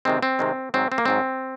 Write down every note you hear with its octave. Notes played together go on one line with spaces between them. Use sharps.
C3 D#3 G#3 C4
C4
C3 D#3 G#3
G#2 F#3 C4
C4
A#3
G#2 F#3 C4